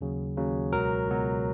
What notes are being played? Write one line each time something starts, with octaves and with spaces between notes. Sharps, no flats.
D#2 C#3 F#3
D#2 C#3 F#3
C#2 B2 F#3 A#4
C#2 B2 F#3